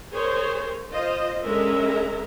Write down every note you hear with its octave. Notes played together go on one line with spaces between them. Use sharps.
G#4 A#4 C5 C#5
F4 C5 D#5
D3 G#3 C#4 A#4 E5 A#5